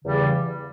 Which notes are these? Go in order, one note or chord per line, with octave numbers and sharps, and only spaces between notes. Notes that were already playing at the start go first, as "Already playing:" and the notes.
E2 C#3 E3 G3